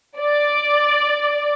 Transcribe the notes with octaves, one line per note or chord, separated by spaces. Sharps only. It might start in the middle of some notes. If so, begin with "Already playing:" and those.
D5